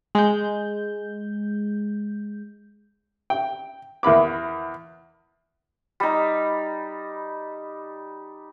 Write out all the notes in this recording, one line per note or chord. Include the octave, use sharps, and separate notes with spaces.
G#3 G6
G5
E2 A#3 B5 D6
G3 D#4